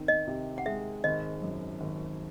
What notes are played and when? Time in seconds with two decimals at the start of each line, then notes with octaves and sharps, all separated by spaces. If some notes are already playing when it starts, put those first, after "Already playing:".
Already playing: D#3 C4
0.08 D#5
0.27 C3
0.58 F#5
0.66 G#3 E5
1.04 G#1 D#5
1.42 F#2
1.81 G#1